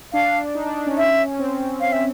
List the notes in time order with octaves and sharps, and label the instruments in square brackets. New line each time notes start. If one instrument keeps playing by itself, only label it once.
[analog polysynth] D4 [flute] F5
[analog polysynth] D#4
D4
D4
C#4
[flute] E5
[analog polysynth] C4
[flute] F5
E5